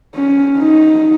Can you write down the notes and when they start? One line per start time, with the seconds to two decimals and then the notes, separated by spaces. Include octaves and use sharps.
0.15 C#4
0.58 D#4